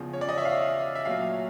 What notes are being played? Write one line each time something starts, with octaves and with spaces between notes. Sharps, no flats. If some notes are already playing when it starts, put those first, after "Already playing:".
Already playing: E2 C#3 F3
C#5
D5
D#5
E5
F5
E5
A#2 F#3 A3 F5